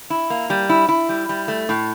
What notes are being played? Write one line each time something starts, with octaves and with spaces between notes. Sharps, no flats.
E4
A#3
G3
E4
E4
G3
G3
A3
A2